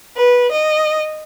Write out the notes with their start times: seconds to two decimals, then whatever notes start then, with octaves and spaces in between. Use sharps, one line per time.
0.16 B4
0.51 D#5